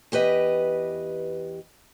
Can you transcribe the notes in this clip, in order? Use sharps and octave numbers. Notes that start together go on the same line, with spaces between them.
E2 G4 B4 D#5